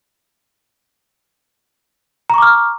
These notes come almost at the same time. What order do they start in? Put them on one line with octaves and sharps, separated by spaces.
A#5 C#6 D6 F6